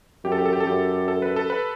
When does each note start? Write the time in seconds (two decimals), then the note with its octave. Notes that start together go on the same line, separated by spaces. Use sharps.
0.24 F#2 G4
0.32 A4
0.38 G4
0.46 A4
0.53 G4
0.60 A4
0.67 F#2 G4
1.08 A4
1.22 B4
1.36 A4
1.50 B4